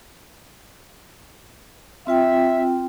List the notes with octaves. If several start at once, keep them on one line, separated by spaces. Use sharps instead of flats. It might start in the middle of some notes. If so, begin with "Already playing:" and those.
C4 F4 E5 G5